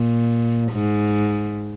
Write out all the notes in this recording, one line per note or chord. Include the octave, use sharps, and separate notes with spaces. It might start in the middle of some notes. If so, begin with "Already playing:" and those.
Already playing: A#2
G#2